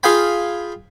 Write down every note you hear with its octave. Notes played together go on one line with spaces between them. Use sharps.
F4 G#4 F5 G5 G#5 B5